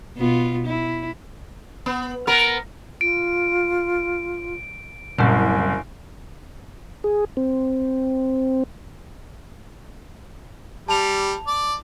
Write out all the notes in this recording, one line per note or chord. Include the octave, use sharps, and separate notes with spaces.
B2 B3 F4
E4
B3
B3 A#4
F4 D7
F#1 C2 A#2 C#3 G#5
G#4
C4
G3 A5 F7
D5